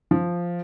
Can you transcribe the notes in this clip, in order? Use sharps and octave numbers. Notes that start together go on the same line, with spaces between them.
F3